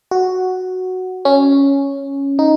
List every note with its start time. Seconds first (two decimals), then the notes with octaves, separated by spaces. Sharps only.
0.11 F#4
1.25 C#4
2.39 D#4